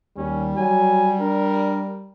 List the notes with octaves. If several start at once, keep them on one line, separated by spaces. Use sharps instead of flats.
D#2 G3 C#4
F#3 G#5
D4 A#4